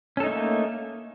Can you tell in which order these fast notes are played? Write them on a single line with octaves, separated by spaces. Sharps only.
C#4 A4 D#4 A3 A#3